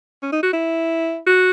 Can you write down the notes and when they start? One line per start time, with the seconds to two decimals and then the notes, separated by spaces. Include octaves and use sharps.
0.22 C#4
0.32 D#4
0.43 F#4
0.53 E4
1.27 F#4